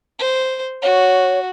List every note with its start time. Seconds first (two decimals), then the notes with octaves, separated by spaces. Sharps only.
0.19 C5
0.82 F#4 C#5